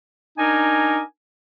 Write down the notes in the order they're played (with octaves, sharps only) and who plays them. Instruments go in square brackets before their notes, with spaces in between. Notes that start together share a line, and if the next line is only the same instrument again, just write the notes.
[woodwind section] D4 D#4 A#4 G#5